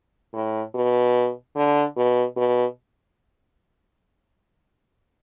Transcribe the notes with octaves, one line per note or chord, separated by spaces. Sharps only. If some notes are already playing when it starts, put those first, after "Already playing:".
A2
B2
D3
B2
B2